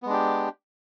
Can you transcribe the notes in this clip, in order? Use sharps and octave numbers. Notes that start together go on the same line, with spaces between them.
G#3 B3 D4 G4